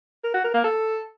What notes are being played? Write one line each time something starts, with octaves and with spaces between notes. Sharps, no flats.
A#4
F#4
A#4
A#3
A4